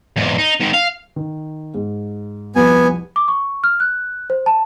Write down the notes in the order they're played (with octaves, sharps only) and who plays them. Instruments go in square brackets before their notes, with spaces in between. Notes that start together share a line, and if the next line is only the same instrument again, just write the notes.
[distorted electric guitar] E2 G#2
D#4
G#2 D#3
F5
[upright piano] D#3
G#2
[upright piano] C2 F2 [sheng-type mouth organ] B3 G#5
[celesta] D6
C#6
F6
F#6
C5
A5